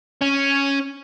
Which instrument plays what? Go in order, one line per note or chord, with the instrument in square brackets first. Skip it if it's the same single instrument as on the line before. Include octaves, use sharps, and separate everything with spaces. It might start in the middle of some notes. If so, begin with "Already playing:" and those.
[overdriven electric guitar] C#4